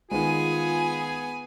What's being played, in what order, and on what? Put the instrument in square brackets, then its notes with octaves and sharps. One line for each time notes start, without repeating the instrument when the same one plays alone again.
[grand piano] D#3 G#3 [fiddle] B3 G#5 [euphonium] F4 [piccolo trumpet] G#4